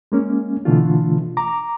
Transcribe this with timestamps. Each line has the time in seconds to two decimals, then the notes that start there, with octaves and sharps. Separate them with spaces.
0.12 G#3 A#3 C#4
0.65 B2 D3 E3 A3 D4 F4
1.37 A#5 D6